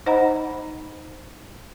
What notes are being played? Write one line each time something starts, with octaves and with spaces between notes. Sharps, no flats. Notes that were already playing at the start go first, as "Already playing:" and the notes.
D#4 C5 D#5 F#5 A#5 B5